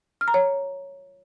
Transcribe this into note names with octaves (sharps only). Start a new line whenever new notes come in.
F6
A#5
C#5